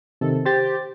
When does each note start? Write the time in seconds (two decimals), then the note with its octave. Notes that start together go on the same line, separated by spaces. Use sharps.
0.21 C3 D#3 A4
0.46 G4 C5 A6